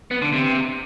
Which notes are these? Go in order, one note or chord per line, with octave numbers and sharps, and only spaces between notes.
B3
D3
C3